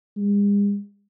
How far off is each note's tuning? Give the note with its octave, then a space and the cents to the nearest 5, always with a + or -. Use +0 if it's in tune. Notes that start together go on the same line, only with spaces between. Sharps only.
G#3 -45